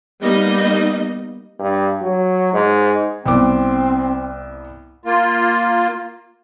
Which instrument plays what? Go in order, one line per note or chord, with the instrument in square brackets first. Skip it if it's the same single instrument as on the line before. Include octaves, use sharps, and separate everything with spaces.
[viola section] G3 A#3 B3 D#4 D#5
[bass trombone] G2
F#3
G#2
[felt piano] C2 B3 D6 [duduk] C4
[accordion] A#3 F4